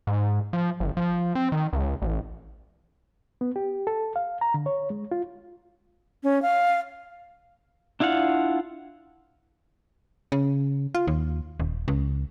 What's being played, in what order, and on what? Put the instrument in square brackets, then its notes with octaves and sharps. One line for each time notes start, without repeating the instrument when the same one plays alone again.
[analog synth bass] G#2
F3
G1
F3
C4
D#3
C#2
A1
[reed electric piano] B3
G4
A4
F5
A#5
D3
C#5
G#3
F4
[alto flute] C#4
F5
[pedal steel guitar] D4 E4 F4 F5 F#5
[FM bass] C#3
F4
D#2
D#1
C#2